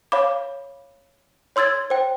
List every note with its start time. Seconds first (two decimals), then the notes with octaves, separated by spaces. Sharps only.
0.12 C#5 F5 B5 D6
1.56 C#5 C6 E6 G#6 A6
1.90 C5 G5